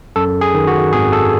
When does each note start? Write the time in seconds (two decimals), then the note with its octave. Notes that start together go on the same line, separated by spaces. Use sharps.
0.16 F#2 A4
0.41 G#4
0.55 D#3
0.67 F#4
0.93 G#1 G#4
1.12 A4